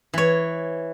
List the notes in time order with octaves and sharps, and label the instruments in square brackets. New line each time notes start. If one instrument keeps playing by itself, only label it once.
[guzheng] E3 C#5